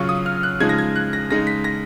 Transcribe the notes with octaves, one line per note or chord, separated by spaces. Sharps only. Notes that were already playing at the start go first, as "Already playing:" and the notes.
Already playing: C#3 F#3 C#4 F4 C#6
D#6
F6
F#6
C#3 F3 G#3 D#4 G#6
A#6
G#6
F#6
A#6
C#3 G#3 D#4 A#6
B6
A#6